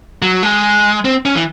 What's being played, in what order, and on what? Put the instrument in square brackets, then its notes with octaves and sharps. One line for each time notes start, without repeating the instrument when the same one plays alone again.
[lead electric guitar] F#3
G#3
C4
C#4
E3